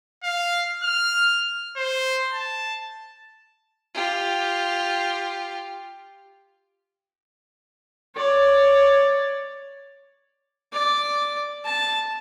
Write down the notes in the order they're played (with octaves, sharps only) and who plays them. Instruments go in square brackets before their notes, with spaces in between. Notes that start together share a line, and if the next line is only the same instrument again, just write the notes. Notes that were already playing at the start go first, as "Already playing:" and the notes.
[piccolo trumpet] F5
F6
C5
A5
[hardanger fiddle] F4 G4
[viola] C#5 D5
[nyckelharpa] D5
A5